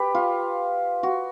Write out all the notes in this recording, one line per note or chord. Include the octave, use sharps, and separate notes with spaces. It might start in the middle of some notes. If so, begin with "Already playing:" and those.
Already playing: G4 B4
F4
F#4